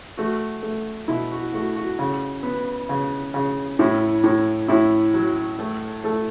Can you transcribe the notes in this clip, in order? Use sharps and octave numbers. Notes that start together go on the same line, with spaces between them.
A3 F#4
A3
B2 E4
F#4
A3 F#4
F#4
C#3
B3
C#3
C#3
A2 E4
A2
A2 E4
F#3
A3 A4
A3 A4